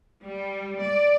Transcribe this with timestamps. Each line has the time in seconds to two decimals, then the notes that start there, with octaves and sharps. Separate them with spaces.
0.24 G3
0.82 D5